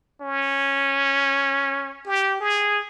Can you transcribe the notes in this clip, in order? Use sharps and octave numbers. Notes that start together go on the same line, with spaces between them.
C#4
G4
G#4